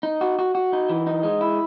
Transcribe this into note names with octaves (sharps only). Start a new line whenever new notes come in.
D#4
F#4
F#4
F#4
D#4
E3
D#4
G#3
E4